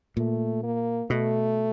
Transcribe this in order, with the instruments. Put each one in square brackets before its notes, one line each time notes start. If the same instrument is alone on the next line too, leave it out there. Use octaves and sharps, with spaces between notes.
[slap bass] A#2 [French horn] A3
[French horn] A#3
[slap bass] B2 [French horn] A3